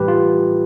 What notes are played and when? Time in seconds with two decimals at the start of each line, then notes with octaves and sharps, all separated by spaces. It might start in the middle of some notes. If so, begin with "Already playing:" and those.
Already playing: A2 E3 G3 G4 B4
0.08 F4